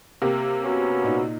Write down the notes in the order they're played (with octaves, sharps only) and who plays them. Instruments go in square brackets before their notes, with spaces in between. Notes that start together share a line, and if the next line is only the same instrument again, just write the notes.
[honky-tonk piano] C3 A#3 [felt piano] G4
[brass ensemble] B3 C#4 F#4
[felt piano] A#2 D#4